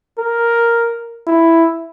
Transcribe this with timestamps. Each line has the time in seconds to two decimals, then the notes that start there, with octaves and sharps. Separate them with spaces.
0.19 A#4
1.27 E4